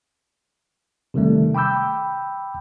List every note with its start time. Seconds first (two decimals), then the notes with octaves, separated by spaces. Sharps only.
1.14 C3 D#3 G3 A3
1.55 G5 B5 D6 E6 G6